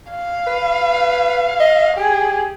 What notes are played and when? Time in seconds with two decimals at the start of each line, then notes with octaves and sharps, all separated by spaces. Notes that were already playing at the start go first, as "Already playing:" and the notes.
0.11 F5
0.47 B4
1.60 D#5
1.97 G4 G#4